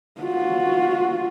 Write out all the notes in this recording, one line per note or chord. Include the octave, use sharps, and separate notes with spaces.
F4 F#4